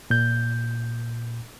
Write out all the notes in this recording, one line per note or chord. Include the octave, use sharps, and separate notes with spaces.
A#2 G6